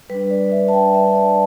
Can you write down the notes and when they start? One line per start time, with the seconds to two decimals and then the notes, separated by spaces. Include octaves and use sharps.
0.10 G3 D4 B4
0.30 D5
0.52 E5
0.68 A5
0.73 G5
0.94 E5
1.15 D5